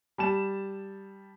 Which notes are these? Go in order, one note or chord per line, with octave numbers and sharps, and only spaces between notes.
G3 A5 E7